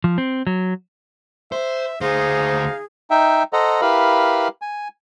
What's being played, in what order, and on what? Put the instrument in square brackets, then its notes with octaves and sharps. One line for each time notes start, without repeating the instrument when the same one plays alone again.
[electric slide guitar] F3
C4
F#3
[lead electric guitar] C5 [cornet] E5
[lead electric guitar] D2 C5 [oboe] D#4 [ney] G#4 [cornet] F5
[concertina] D#4 E5 G5
A4 C5 D#5 F#5 A#5
E4 G4 A#4 B4 F5 B5
G#5